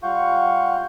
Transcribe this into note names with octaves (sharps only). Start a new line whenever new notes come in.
G3 F4 F5 F#5 C#6 G6